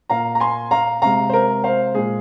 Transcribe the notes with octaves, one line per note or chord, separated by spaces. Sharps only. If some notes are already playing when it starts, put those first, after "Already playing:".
A#2 A#3 F5 A#5
A#5
G#5 C6
F5 A#5
C3 G#3 F5 A#5
C5
A#4
C5 F5
A#2 G#3 G#4